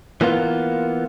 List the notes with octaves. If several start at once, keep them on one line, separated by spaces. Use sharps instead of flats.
E3 A#3 B3 F4